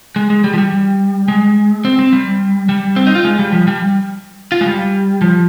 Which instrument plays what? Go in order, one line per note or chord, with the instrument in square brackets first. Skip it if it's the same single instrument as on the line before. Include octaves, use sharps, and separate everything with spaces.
[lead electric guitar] G#3
G#3
G3
F3
G3
G#3
C4
C4
G3
G3
C4
D#4
F4
G#3
G3
F3
G3
F4
G#3
G3
F3